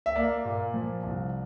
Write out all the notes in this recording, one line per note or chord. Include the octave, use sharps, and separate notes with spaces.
E5
A#3 D5
A#2
F3
C2